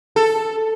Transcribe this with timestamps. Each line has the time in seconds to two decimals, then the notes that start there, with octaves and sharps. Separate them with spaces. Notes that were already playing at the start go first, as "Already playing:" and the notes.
0.16 A4